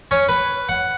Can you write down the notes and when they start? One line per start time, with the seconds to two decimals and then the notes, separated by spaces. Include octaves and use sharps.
0.11 C#4
0.29 B4
0.69 F#5